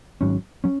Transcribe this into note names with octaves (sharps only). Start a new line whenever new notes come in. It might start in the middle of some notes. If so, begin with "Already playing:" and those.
G#1 G#2 F#3 C#4
F#3 C#4